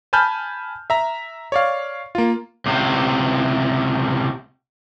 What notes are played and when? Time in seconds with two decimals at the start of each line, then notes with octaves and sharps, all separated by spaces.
0.13 G#5 A5 B5 F6 G6
0.90 E5 A#5
1.52 C#5 D5 F5
2.15 A#3 F4
2.66 C#2 C3